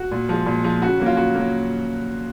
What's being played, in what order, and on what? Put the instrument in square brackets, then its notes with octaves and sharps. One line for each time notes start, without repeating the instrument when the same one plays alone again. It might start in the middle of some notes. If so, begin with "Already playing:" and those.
Already playing: [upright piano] F#4
A#2
F3 G#3
A#2
F3 G#3
C#3 F#4
F#3 A#3
F4
C#3 F#4
F#3 A#3